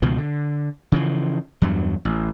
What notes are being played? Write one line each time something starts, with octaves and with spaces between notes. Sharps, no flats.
C#2 B2 D#3 F3
D3
C#3 E3 F3
E2 G2 F#3
A1